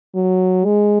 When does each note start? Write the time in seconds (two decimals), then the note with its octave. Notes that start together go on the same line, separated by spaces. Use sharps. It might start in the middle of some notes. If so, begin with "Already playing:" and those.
0.15 F#3
0.65 G#3